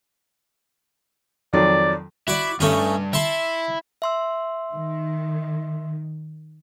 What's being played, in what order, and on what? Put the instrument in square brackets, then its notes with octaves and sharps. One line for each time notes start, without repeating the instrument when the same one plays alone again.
[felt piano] F2 D#3 F#3 [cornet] D5
[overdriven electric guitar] E4 [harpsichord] F#4 D5
[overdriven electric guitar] G2 [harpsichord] A3 C#4 D#4
[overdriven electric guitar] E4 [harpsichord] E5 A5 C6
[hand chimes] E5 C6 E6
[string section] D#3